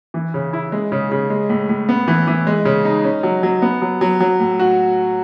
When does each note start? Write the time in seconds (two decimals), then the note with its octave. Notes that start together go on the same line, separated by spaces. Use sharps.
0.14 E3
0.34 C#3
0.53 E4
0.72 G#3
0.92 C#3
1.12 C#3
1.30 G#3
1.50 A2
1.69 A2
1.89 B3
2.08 E3
2.27 E3
2.47 G#3
2.65 C#3
2.85 D#4
3.05 C#4
3.23 F#3
3.43 F#3
3.62 B3
3.82 F#3
4.01 F#3
4.20 F#3
4.40 A2
4.59 F#4